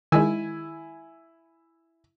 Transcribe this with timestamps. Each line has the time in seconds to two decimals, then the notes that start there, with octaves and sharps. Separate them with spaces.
0.12 D#3 G#3 E4 G#5 E6